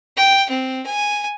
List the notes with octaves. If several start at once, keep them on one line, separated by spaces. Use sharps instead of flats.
G5
C4
G#5